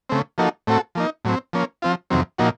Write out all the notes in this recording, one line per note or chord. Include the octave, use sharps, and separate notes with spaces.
C#3 A3 C4
F3 A#3 D#4 F#4 A4
A2 A3 C4 F#4 A4
F3 A#3 D#4
A2 F#3 C4
F3 A#3 C#4
F3 C4 F4
F2 C3 D#3 F#3 C4
A#2 F3 A#3 D#4 F#4